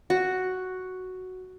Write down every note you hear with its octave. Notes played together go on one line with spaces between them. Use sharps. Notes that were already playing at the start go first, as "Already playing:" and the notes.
F#4